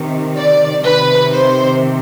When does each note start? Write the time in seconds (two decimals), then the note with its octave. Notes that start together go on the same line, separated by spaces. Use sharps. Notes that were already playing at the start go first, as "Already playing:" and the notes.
Already playing: C3 D#3
0.37 D5
0.86 C3 D#3 B4
1.33 C5